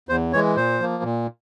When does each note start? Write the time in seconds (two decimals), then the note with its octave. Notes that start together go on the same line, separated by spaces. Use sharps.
0.09 E2 C5
0.32 E3 C#5
0.35 G#3
0.56 A#2 C5
0.80 F3 A#3
1.03 A#2